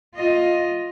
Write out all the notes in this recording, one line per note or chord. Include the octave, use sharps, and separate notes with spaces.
F4 D#5